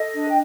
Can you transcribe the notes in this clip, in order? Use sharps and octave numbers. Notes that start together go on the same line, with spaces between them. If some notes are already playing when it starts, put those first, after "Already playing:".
Already playing: A4 D#5
D4
G5